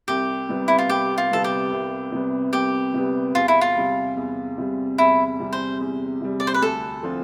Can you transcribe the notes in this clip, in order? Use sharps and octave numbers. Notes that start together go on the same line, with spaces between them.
C2 G4
C3 G3 B3
E4
F4
C2 G4
F4
C3 G3 B3 A4
G4
C2
C3 G3 B3
C2 G4
C3 G3 B3
E2 F4
E4
F4
C3 G3
E2
C3 G3
E2 E4
C3 G3
C5
E2
C3 G3
D5
C5
B4
D2 A4
D3 F3 C4 F4